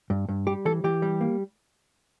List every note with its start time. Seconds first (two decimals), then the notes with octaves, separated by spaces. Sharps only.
0.10 G2
0.29 G2
0.47 G3 G4
0.65 E3 A4
0.84 E3 G4
1.02 G3
1.21 A#3